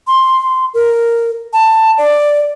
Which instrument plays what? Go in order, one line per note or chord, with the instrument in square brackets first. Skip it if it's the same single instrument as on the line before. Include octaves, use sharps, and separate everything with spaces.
[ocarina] C6
A#4
A5
D5